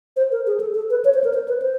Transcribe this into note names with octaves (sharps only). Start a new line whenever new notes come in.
C5
A#4
G#4
A4
A4
B4
C#5
C5
A#4
C5
B4
C5